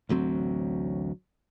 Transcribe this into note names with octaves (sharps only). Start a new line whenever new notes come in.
A1 D2 F#3 C4